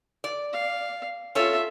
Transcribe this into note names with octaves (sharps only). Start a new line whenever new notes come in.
D5
F5
C#4 F4 A4 C#5 E5